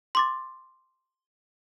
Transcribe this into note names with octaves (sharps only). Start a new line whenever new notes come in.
C6 D6 A6